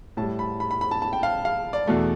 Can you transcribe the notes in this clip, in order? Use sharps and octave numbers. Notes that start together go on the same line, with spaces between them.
A2 G3 A5
B5
B5
B5
B5
A5
A5
G5
F5
F5
D5
E2 B2 A3